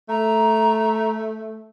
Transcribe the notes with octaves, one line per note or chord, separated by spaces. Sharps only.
A3 A#5